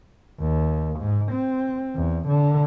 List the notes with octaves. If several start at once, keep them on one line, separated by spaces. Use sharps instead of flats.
D#2
G#2
C4
E2
D3